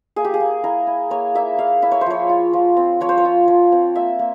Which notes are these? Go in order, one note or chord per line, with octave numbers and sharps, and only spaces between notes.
A#3 G#4
G4
G#4
A#3
E4 A#4
E4
A#3 C#5
A#3 E5
E4 F5
E4 E5
C#5
C5
F3 C#5
F4
F3
C4
F3 C#5
C5
C#5
F4
F3
C4
A#3 E5
A#3